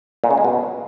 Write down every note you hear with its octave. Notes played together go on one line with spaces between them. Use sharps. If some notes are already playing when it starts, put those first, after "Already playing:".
A#2
C#3
G#3
B2